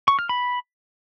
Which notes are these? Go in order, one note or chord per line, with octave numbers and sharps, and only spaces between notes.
C#6
F6
B5